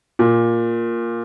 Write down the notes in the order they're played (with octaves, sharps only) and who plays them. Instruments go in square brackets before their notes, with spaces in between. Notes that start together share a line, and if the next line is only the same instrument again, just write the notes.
[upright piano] A#2